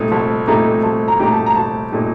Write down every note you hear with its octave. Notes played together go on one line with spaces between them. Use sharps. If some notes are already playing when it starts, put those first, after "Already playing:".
Already playing: C2 A#2 A3 D#4 G4
C2 A5
A#2 A3 D#4 G4 A#5
C2 A5
A#5
A#2 A3 D#4 G4 A#5
A5
A#5
C2 A5
A#2 A3 D#4 G4